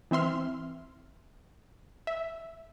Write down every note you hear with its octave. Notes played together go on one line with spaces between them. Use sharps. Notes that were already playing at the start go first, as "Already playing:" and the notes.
E3 C4 E5 C6 F6
E5